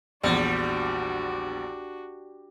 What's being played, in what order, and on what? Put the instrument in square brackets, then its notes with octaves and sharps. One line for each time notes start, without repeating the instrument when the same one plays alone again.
[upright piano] A#1 E2 [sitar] G3 [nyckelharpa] D4 F#4